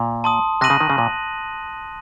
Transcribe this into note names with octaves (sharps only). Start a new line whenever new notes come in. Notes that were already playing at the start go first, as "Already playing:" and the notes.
Already playing: A#2
A5 C6 D#6
C3 F#6 A#6 D#7 F#7
C#3
D#3
C#3
A#2